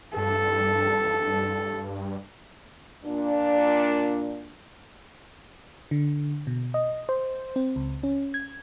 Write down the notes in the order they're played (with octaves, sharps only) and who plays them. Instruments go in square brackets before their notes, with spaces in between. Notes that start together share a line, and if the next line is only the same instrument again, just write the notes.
[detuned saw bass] G2 [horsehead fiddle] A4
[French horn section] A#2 D4
[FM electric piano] D3
B2
D#5
C5
C4
C#2
C#4
G#6